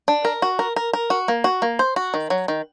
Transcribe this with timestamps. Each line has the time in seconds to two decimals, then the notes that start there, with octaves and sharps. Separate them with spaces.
0.08 D4
0.25 A#4
0.42 F#4
0.59 A#4
0.76 A#4
0.93 A#4
1.10 F#4
1.28 A#3
1.44 F#4
1.62 A#3
1.79 C5
1.96 F#4
2.14 D#3
2.30 F#3
2.48 D#3